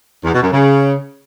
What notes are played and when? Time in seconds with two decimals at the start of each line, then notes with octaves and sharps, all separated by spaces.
0.24 E2
0.34 B2
0.43 F#2
0.52 C#3